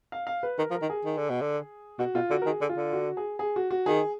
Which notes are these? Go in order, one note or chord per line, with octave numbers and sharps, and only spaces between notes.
F5
F5
B4
D#3 A#4
F3
A#4
D#3
G#4
D#3
D3
B2
D3
B2 F#4
B2 F4
D3 F#4
A#4
D#3 G#4
D3
F4
D3
F#4
G#4
G#4
F#4
F#4
D#3 G#4